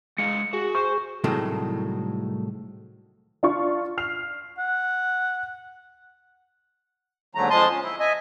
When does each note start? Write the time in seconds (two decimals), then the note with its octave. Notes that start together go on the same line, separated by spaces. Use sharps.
0.18 G#3 D#5 F5 C#7
0.53 F#4 G#4
0.75 C5 C#6
1.24 C2 A2 D#3 F#3 G#3 A3
3.43 D4 F4 C#6
3.98 F6 C7 F7
4.58 F#5
7.35 D#2 G#2 D3 F#3 A3 A#5
7.50 F2 F3 G#3 A5 C6 D#6
7.71 C#4
7.83 E4
8.00 D#5 E5 G#5